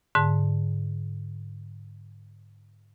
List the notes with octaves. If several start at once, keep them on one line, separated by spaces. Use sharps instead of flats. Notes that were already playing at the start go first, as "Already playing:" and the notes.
G#2 D3 A5